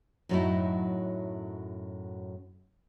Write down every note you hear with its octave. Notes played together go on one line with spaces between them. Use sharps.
F#2 A2 F#3 A3 D#4 E4